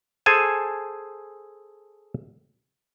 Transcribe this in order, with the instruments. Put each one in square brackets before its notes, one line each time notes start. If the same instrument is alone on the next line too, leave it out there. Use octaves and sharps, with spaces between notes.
[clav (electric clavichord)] G#4 A4 C5 G#5 A5